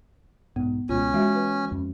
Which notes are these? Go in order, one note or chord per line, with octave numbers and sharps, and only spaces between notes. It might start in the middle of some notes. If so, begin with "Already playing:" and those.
B1 G#2 B3
C#2 B2 G#3 C#4 F4
E3 G#3 F#4 E5
B4
F2 C#4